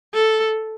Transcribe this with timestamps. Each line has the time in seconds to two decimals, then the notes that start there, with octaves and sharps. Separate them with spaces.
0.14 A4